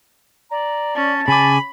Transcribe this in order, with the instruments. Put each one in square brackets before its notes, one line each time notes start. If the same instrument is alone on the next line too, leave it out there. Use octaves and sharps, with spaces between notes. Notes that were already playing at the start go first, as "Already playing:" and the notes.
[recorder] D5 [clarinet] A#5
[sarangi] C#4 [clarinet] A5
[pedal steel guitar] C#3 D6 [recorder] G#5 [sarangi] B5